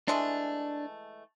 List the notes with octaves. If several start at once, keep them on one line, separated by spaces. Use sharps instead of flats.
E3 G#3 A3 D4